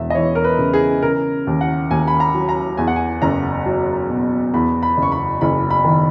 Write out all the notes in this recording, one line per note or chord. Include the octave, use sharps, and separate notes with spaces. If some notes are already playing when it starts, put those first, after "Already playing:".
Already playing: E1 E2 E5
D#5
E3 C#5
A#4
B4
C#3
G#4
C#3 A#4
D#2
F#5
D#2 G#5
B5
A#5
F#3
A#5
E2 G#5
F#5
G#5
F#1 A#5
F#3
B2
E2 B5
B5
F#1
C#6
B5
F#1 B5
B5
D#3